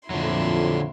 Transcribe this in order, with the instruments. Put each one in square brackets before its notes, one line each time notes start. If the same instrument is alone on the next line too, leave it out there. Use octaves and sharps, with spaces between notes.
[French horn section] F2 [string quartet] A#2 E4 C6 [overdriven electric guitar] D3 F#3